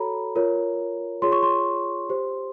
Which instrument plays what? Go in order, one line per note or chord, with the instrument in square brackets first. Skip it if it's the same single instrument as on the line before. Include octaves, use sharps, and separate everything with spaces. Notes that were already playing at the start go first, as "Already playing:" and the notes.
Already playing: [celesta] F#4 A4 C#5 A#5 B5
F4 A#4 C#5
F4 G#4 C#5 C6
C#6
C6
G4 C5